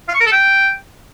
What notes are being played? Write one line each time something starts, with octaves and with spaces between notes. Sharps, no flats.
F5
C#6
A#4
A4
G5